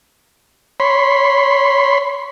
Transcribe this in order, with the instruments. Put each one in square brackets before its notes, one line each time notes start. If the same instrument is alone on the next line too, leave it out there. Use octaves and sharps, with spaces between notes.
[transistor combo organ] C#5 B5 C6